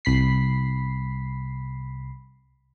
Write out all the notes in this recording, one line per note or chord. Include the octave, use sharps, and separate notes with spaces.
C2 B5 B6 C7